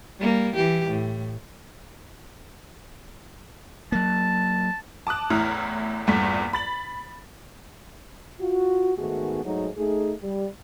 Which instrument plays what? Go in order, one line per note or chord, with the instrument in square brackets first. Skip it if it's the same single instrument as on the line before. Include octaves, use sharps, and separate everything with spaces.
[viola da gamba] G3 A#3
E3 G4
A2
[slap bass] F#3 A#3 [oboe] A5
[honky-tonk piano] A5 D6 D#6 F#6
A1 E2 A2 E4 A#5 F6
A#1 E2 G2 A3 B6
B5 A6 F#7
[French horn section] F4 F#4
G#2 D#3 A3 B3 F#4 G#4
G#2 F#3 A3 D#4 F#4 G#4
A3 D#4 G#4
G3